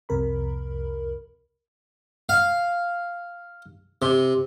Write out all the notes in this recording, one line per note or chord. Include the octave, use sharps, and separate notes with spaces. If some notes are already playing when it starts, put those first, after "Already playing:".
C2 F2 C3 A#4 B5
F5
C3